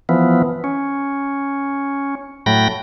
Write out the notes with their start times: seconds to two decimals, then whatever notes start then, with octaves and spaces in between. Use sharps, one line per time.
0.09 E3 F3 B3
0.64 C#4
2.46 A2 F#3 A3 G5 B5 A#6